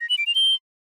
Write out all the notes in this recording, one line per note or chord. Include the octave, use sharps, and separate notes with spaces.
A#6
F#7
D7
F7
G7